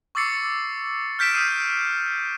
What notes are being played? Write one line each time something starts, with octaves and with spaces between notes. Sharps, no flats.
C#6 D6 E6 A6 C7 C#7
F6 G6 B6 D7 E7
D#6 B6 C7 D#7